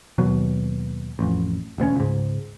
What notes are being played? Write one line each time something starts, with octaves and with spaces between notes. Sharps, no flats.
D#2 B2 F#3
A1 F2
E1 D2 B3 C#4
C#2 G#2